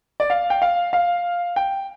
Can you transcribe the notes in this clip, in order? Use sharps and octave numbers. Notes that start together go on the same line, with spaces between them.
D5
F5
G5
F5
F5
G5